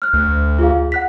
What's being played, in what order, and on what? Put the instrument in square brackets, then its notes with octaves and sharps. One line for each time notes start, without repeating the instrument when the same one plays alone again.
[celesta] F6 F#6
[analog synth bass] D2
[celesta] F4 G#4 F5
F#5 F#6 B6